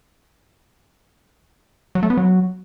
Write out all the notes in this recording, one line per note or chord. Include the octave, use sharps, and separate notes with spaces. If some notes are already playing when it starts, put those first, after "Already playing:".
F#3
A3
B3
F#3